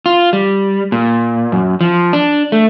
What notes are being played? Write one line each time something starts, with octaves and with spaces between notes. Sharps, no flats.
F4
G3
A#2
F#2
F3
D4
A3